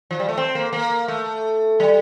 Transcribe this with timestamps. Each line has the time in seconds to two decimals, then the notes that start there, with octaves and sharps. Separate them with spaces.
0.11 F3
0.20 G3
0.29 A3
0.38 C4
0.55 A#3
0.73 A#3
1.08 A3
1.80 G3